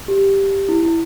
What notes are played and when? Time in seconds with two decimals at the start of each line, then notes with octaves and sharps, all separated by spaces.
0.08 G4
0.69 E4
0.83 E4